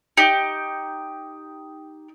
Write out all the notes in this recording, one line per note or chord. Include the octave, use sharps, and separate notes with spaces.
D#4 G4